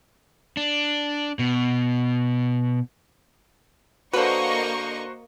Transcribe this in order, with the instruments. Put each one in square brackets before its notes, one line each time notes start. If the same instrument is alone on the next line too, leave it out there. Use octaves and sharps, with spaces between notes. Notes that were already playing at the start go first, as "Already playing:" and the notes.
[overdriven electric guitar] D4
B2
[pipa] D3 B4 [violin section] A#3 D#5 C#6 [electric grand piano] F#4 C5